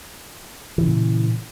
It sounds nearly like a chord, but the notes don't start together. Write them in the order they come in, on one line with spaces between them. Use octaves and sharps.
E3 C#3 A#2